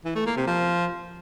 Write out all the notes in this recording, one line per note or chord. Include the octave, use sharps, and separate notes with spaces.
E3
A3
A#3
C3
F3